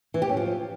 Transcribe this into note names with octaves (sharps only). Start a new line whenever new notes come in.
E3
G4
C#4
F3